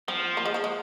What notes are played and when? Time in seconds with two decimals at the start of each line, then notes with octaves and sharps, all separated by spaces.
0.08 F3 C4
0.37 A#3
0.45 G#3
0.54 F3
0.64 G#3